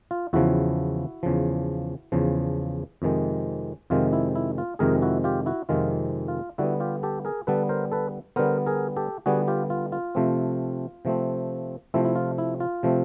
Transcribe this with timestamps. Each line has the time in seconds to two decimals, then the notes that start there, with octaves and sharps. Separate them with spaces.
0.11 F4
0.33 E2 C#3 F3 E4 F#4
1.23 E2 C#3 F3
2.12 E2 C#3 F3
3.02 F2 C3 D#3 G#3
3.90 F2 C3 D#3 G#3 F4
4.13 E4
4.36 E4
4.58 F4
4.79 F2 C3 D#3 G#3 G#4 A#4
5.02 E4 F#4
5.24 F4 G4
5.46 E4 F#4
5.69 F2 C3 D#3 G#3 F4
6.28 F4
6.58 D3 G3 B3 E4 F#4
6.80 F4 G4
7.03 G4 A4
7.25 G#4 A#4
7.47 D3 G3 B3 A4 B4
7.69 A#4 C5
7.92 A4 B4
8.36 D3 G3 B3 A#4 C5
8.66 G#4 A#4
8.97 G4 A4
9.26 D3 G3 B3 F#4 G#4
9.48 F4 G4
9.70 F4
9.92 F4
10.15 C3 F3 A3 C4
11.05 C3 F3 A3 C4
11.94 C3 F3 A3 C4 E4
12.05 E4
12.16 F4
12.38 E4
12.60 F4
12.83 C3 F3 A3 C4